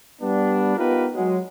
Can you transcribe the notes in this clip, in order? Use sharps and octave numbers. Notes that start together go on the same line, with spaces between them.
G3 B3 D4
B3 D#4 F4 G4 A#4 B4
F#3 G#3